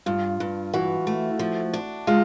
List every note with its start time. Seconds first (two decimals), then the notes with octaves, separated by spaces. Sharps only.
0.06 G2 F4
0.40 G2
0.74 E3 F#4
1.07 A3
1.39 F3
1.73 D4
2.07 G#3 F4